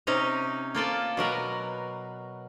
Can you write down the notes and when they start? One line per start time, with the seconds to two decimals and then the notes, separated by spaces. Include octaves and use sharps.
0.07 C3 C#4 D#4 A#5
0.75 A#3 F4 A4 D5
1.17 B2 F#3 A#4 B4